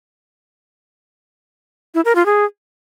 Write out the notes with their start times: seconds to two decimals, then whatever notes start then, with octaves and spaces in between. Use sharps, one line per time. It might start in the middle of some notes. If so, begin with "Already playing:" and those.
1.95 E4
2.05 A#4
2.15 F4
2.26 G#4